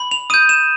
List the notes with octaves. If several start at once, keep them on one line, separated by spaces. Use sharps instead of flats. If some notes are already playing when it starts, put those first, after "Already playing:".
Already playing: B5
F7
D#6 G6 D#7
E7